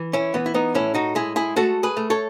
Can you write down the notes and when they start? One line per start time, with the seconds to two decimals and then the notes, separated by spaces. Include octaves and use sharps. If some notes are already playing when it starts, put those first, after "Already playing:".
Already playing: E3
0.13 C#4 E4
0.34 E3 B3
0.46 E4
0.54 B3 D#4
0.75 A2 C#4 E4
0.95 D#4 F#4
1.15 G#3 E4 G#4
1.36 E4 G#4
1.56 A3 F#4 A4
1.83 G#4 B4
1.97 A3
2.10 A4 C#5